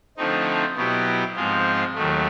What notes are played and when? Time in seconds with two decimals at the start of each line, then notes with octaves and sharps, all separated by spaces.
0.17 D3 F3 A3 C4 D#4
0.76 B2 F#3 B3 E4 G4
1.36 G#2 F3 G#3 C4 F4
1.95 D#2 D#3 F#3 A3